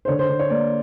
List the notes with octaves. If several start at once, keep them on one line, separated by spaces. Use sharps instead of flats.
C5
D3 C#5
C5
D3
C#5
A#3 D5